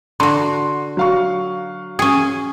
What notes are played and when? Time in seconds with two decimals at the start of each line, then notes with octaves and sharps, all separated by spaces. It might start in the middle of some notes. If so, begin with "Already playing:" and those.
0.20 D3 F#4 C6
0.97 F#3 F5 C#6
1.99 C#4 G#4